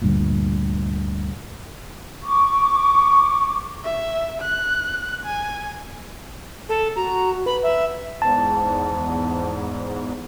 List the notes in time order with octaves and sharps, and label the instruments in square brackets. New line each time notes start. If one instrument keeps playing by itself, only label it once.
[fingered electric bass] D2 G2 A#2
[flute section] C#6 D6
[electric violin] E5
F#6
G#5
[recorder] A4
[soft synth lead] F#4 [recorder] A#5
[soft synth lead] B4 [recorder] B5
[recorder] E5
[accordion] E2 G#2 [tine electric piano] A5